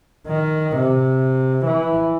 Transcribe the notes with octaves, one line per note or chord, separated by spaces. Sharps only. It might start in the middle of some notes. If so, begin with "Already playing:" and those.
D#3
C3
E3